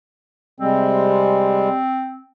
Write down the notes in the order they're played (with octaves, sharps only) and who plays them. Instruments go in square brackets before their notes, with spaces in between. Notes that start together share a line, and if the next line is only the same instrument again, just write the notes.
[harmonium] C3 G3 G#3 [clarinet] C4